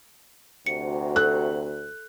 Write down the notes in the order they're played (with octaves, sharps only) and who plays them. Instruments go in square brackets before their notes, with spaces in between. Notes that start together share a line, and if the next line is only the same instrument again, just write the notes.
[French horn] D2 [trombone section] C3 F#4 [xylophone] C#7
[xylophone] A4 [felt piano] F#6